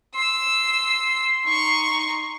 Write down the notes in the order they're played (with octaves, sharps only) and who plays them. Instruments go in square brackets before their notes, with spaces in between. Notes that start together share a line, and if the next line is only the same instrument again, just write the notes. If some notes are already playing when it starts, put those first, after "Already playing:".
[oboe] C6 [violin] E6
[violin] D#4 C#6